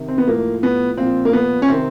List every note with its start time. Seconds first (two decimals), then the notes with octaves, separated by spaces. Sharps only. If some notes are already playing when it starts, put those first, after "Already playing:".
Already playing: C3 D#3
0.08 C4
0.18 B3
0.28 A2 F3 A#3
0.63 B3
0.97 A#2 F3 C4
1.25 A#3
1.33 B3
1.62 C#4
1.68 C3 D#3 C4